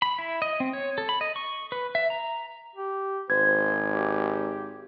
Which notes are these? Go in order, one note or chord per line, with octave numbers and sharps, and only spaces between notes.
B5
E4
D#5
C4
C#5
A4
B5
D#5
C#6
B4
E5
A#5
G4
G#1 C5 G#6
G4